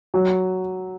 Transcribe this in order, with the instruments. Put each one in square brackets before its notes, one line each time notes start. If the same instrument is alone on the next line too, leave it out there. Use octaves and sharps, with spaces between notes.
[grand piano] F#3